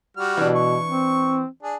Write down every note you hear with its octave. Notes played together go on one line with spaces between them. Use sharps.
G3 F#4 F6
B2 E3 D4
C#6
C4
D4 G#4